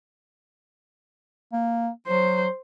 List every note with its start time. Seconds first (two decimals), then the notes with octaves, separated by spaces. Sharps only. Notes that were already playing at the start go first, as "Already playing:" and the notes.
1.52 A#3
2.07 F#3 C5